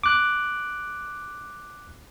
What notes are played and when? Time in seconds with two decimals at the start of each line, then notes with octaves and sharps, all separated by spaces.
0.04 D6 F#6